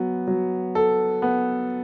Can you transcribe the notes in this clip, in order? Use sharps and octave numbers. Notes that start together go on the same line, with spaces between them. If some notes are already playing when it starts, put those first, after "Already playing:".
Already playing: F#3 B3
F#3
A4
B3